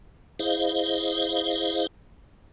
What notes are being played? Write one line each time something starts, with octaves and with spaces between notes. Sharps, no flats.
E4 G#4 C5 D#5 F5